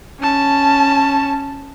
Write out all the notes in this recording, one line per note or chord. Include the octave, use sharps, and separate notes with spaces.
C#4 A5